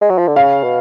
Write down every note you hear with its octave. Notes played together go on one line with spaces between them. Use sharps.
G#3
F#3
F3
D3
C#3 F5
B2